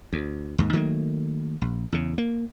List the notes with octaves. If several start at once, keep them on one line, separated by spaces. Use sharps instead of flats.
D2
D#2 G#2
D#3 F#3 A3 A#3
A#1
E2 C#3
A#3